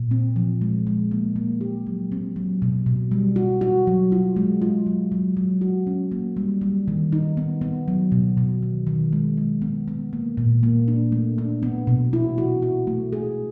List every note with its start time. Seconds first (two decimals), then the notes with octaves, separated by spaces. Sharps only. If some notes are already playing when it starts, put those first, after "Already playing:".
Already playing: A#2
0.11 C4
0.36 F3
0.61 G#3
0.87 G#3
1.11 A#3
1.36 A#3
1.61 G4
1.87 F#3
2.12 C4
2.36 F#3
2.62 B2
2.86 B2
3.12 G3
3.36 F#4
3.61 F#4
3.87 F#3
4.12 F4
4.36 G#3
4.62 F4
4.86 F#3
5.12 F#3
5.37 F#3
5.61 F#4
5.87 C#4
6.12 A#3
6.37 G3
6.61 G3
6.88 D#3
7.12 D#4
7.37 B3
7.61 B3
7.88 F#3
8.12 B2
8.37 B2
8.63 D#3
8.87 D#3
9.13 G#3
9.38 G#3
9.62 B3
9.88 B3
10.13 A#3
10.37 A#2
10.63 A#3
10.88 D4
11.12 A3
11.38 D4
11.63 B3
11.87 B2
12.13 E4
12.38 F#4
12.62 F#4
12.87 A3
13.13 G#4